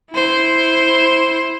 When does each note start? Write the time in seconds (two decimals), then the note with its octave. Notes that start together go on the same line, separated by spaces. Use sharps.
0.11 E4 C5